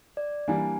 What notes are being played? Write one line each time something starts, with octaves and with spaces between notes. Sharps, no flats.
D5
E3 G3 A#3 D4 G#5